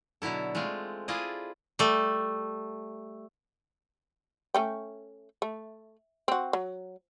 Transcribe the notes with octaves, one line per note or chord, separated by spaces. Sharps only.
B2 D3 F#3 E4 A4
G#3 A3 C4 F4
E4 F4 G#4 A4 D5 D#5
G3 A3
A3 C#4 G5
A3
C4 F#4
F#3